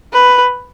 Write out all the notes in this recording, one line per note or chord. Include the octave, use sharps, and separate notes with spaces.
B4